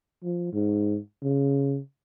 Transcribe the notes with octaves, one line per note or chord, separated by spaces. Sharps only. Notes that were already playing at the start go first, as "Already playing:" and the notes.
F3
G#2
C#3